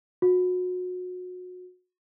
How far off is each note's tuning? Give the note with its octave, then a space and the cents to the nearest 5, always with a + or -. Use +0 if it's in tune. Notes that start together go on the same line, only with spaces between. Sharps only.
F#4 -30